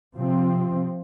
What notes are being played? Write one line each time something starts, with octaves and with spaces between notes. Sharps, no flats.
C3 F3 C4